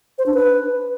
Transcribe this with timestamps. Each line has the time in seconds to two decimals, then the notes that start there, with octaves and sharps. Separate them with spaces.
0.18 C5
0.26 D4
0.34 B4